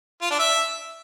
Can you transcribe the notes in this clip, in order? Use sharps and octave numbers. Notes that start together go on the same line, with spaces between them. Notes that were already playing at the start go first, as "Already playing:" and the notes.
F4
D4
E5